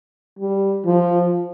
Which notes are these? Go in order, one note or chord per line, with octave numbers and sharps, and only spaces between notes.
G3
F3